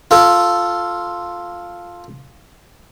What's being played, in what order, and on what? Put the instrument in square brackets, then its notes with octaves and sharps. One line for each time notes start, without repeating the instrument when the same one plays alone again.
[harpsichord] F4 A4